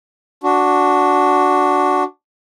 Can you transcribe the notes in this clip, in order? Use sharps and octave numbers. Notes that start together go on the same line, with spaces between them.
D4 F#4